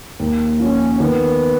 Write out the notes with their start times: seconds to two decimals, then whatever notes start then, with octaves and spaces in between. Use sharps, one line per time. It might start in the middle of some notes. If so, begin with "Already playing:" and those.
0.20 D#2
0.60 F3 C#4
1.00 D#3 B3